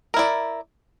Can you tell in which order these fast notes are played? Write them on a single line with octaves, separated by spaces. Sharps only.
A#4 E4 D5